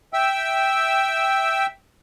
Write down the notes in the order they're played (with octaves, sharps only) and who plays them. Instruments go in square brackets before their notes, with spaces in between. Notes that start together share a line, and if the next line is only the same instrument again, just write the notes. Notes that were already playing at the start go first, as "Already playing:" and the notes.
[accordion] E5 G5 E6